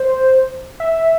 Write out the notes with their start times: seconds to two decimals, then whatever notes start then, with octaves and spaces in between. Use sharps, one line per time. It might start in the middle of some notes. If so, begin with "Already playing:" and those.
Already playing: C5
0.80 E5